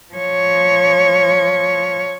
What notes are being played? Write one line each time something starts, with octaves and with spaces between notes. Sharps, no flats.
F3 C#5